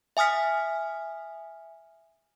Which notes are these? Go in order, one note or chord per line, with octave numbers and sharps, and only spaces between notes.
E5 G#5 D#6 F6 B6